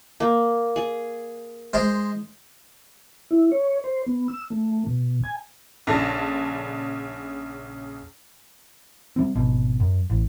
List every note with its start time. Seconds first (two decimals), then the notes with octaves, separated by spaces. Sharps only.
0.20 A#3
0.76 G#4
1.73 G#3 C5
3.31 E4
3.52 C#5
3.84 C5
4.06 B3
4.28 E6
4.50 A3
4.87 B2
5.24 G#5
5.87 A#1 C#3 D4 A4 A5 A#6
9.16 G3 C4
9.35 G#1 B2
9.80 F#2
10.10 A1